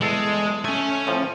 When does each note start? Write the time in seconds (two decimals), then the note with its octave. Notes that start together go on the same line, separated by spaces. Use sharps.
0.01 E2 G#3 A4
0.65 A3 C#4 G#5
1.07 A2 F3